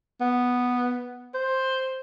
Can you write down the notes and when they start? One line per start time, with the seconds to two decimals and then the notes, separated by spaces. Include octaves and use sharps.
0.20 B3
1.34 C5